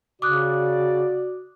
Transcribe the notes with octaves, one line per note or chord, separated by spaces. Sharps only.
C#3 F#4 D5 D6 D#6 F#6